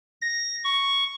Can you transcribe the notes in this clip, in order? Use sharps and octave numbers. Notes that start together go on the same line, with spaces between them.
A#6
C#6